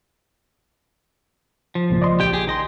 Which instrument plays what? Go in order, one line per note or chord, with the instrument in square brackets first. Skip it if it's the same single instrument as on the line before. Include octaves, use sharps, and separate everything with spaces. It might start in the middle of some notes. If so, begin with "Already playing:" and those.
[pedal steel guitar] F3
[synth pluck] G#1 C#2 A#2
D5 D#5 C6
[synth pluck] A#1 [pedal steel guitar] G4 G5
[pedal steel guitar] G4 G#4
D#3 D#5 C6